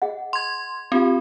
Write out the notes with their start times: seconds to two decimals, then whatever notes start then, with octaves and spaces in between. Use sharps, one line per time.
0.02 G#4 D#5 F#5
0.33 C6 G#6
0.92 C4 D4 F4 G4